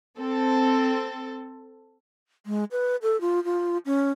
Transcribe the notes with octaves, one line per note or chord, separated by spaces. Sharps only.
C4 A4
G#3
B4
A4
F4
F4
C#4